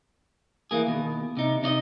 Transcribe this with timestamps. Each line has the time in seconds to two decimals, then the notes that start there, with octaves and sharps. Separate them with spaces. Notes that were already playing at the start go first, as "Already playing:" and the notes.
0.71 E3 A#3 G#4
0.87 D#2 B2
1.37 C3 D#4
1.63 C3 D#4 D5 D#5